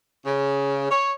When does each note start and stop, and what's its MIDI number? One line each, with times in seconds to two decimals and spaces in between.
0.25 0.90 49
0.91 1.11 73